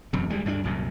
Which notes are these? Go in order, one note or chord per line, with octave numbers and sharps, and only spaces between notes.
E1 F#2 C3
D2 G3 G#3
D2 G2 G3 D4
C2 F#2 A#2